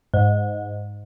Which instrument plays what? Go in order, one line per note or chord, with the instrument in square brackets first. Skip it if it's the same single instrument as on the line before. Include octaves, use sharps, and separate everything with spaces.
[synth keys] G#2